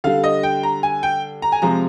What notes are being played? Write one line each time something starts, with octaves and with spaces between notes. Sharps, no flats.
D3 G3 F5
D#5
G5
A#5
G#5
G5
A#5
G#5
C3 F3 G#3 A#5